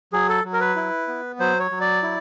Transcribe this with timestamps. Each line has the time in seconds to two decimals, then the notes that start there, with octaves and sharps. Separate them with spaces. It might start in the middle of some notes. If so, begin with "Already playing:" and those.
0.13 F#3 G#4
0.29 A4
0.44 F#3
0.53 A#4
0.61 B4
0.76 E4
1.08 B3
1.40 F#3 C5
1.60 C#5
1.71 F#3
1.81 D5
2.03 E4